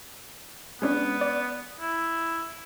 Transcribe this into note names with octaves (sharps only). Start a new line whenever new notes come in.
G#3 B3 C#4 D4
D5
E4